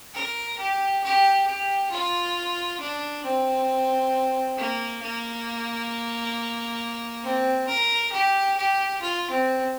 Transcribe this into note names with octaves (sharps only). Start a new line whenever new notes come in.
A#4
G4
G4
G4
F4
D4
C4
A#3
A#3
C4
A#4
G4
G4
F4
C4